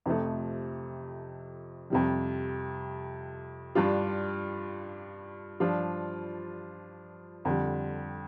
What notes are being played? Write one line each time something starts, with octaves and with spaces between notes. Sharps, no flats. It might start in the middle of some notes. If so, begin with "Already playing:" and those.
F2 C3 F3 A3
F2 C3 G3
G2 G3 D4 F4
G2 F3 D4 F4
F2 D3 G3